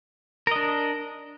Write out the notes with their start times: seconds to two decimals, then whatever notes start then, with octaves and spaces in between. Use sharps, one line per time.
0.47 A#4
0.51 D#5
0.56 D4